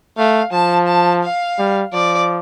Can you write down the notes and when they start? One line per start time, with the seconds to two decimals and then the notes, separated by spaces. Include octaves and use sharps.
0.18 A3 F5
0.53 F3 A5
0.88 A5
1.23 F5
1.59 G3
1.93 F3 D5